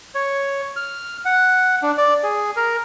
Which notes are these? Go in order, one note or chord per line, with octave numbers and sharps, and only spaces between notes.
C#5
F6
F#5
D4
D5
G#4
A#4